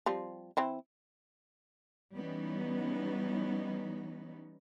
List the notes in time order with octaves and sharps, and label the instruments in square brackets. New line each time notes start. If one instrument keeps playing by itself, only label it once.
[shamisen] F3 G3 C4
E3 C4 E4
[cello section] E3 G3 B3 C#4 D#4